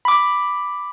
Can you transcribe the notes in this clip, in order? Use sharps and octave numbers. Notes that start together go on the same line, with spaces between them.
B5 D6